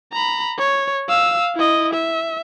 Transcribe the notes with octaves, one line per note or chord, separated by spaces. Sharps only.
A#5 B5
C#5
F5 E6
E4 D#5
E5